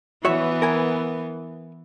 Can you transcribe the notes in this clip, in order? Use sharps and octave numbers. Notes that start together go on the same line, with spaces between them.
E3 B3 F#4 C#5 E5
A#4 G#5